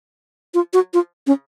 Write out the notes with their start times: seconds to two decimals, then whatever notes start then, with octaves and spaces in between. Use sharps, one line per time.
0.54 F4
0.73 F#4
0.94 F4
1.27 C#4